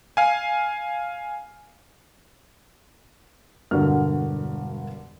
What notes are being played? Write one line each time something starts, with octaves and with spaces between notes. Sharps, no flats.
F5 G#5
E1 G2 D3 F#4 A#4 F6